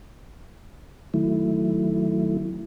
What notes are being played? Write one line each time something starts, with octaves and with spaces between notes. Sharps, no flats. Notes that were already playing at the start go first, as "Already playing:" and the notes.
D#3 F#3 A3 E4